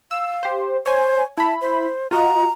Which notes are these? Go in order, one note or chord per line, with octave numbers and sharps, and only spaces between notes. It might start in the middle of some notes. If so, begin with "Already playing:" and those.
F5 E6
G4 C5
C5 C#5 G#5
E4 A5 B5
C5
F4 F#4 D#5 A#5